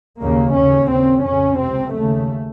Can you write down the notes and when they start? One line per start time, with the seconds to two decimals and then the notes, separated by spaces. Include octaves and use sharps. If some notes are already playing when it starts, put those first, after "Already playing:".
0.21 D#2 C#3 A#3
0.55 D#2 C#3 C#4
0.90 D#2 C#3 C4
1.25 F2 C#3 C#4
1.60 C#2 C3 C4
1.95 D#2 C#3 A3